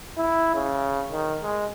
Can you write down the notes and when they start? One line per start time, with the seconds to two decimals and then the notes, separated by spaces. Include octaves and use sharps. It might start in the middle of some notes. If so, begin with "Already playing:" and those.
0.17 E4
0.55 C#3
1.12 D#3
1.42 G#3